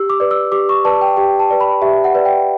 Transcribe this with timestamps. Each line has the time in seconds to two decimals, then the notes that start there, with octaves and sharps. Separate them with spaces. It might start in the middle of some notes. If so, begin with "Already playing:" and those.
Already playing: G4 E6
0.10 D6
0.20 B4 D5
0.31 E6
0.52 G4 D6
0.69 C#6
0.85 B4 D5 A5
1.01 G5
1.17 G4 G5
1.39 A5
1.50 B4 D5
1.60 B5
1.82 G4 E5
2.04 F#5
2.15 B4 D5
2.25 G5